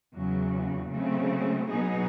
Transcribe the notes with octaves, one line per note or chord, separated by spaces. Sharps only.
E2 C#3 F#3
C#3 F#3 A3 C4
B2 F#3 B3 D#4 G#4